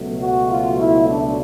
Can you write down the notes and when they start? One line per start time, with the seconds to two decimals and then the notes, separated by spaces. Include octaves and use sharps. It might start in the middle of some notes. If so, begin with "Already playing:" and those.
Already playing: C#2 B2 F#3 A3
0.21 F#4
0.50 F4
0.78 E4
1.06 D4